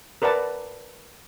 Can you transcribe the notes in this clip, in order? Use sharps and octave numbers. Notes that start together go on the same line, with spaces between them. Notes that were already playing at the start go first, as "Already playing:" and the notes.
A#4 B4 D5 F#5 A5